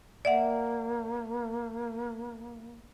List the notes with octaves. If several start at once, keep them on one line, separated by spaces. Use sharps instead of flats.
A#3 D5 E5 F#5